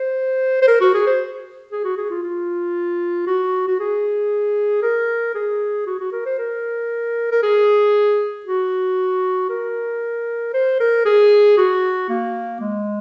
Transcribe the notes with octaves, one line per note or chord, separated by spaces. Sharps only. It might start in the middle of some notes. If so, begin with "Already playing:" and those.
Already playing: C5
C5
A#4
F#4
G#4
C5
G#4
F#4
G#4
F4
F4
F#4
F#4
G#4
A#4
G#4
F#4
F#4
A#4
C5
A#4
A#4
G#4
F#4
A#4
C5
A#4
G#4
F#4
A#3
G#3